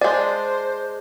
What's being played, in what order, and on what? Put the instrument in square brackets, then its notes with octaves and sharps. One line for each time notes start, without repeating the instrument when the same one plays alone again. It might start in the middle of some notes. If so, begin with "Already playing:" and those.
[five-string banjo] G#3 D4 [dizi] C5 [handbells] D5